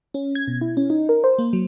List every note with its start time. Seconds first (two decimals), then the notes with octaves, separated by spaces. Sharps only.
0.14 C#4
0.35 G#6
0.48 B2
0.61 E4
0.77 C#4
0.90 D#4
1.09 A#4
1.24 C5
1.39 A#3
1.53 F#3